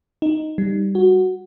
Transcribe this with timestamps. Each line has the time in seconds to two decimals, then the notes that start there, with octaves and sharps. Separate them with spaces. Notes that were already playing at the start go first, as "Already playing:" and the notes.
0.22 D#4
0.58 G3
0.95 F#4